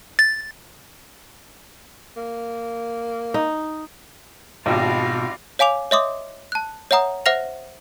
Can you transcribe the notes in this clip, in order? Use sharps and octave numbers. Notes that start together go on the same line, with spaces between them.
A6
A#3
D#4
G#1 B2 G3 F4 F#4 D5 D#5 A5
C#5 F5 G#5 D6 F7
C#5 D#5 E5 C6 D6 D#6
A5 F#6
C#5 E5 F#5 A#5 D#6
C5 E5 F#5 F6 A#6 F7